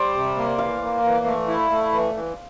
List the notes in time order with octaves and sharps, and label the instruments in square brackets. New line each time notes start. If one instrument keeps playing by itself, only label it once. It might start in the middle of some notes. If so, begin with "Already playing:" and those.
Already playing: [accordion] G3 [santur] C5 D5
[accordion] C3
A#3
[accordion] E3 [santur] F5
[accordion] A#3
E3
A3
E4
A3
E3
E3